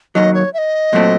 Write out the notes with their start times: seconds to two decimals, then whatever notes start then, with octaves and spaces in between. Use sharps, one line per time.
0.15 D#2 D#3 F#3 D#5
0.34 C#5
0.54 E5
0.58 D#5
0.93 A#2 F#3 A3 C4